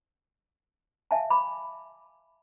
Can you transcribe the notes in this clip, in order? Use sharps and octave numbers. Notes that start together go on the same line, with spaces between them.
E5 F5 G#5 A5
B5 D6